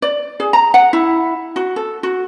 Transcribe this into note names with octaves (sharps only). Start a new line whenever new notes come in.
D5
G#4
A#5
F#5
E4
F#4
A4
F#4